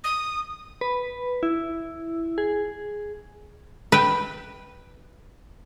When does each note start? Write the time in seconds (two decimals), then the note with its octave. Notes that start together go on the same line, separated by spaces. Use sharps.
0.04 D#6
0.81 B4
1.43 E4
2.38 G#4
3.92 B4 G5